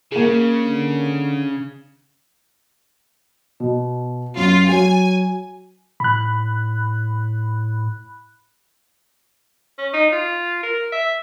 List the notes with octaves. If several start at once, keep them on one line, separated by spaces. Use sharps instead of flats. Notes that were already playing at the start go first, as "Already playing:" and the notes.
C#3 A#3 G#4
D3
B2
F#2 F4
F#3 G#5
A2 B5 F#6
C#4
D#4
F4
A#4
E5